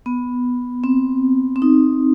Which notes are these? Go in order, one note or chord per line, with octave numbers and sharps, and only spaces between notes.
B3
C4
C4
D#4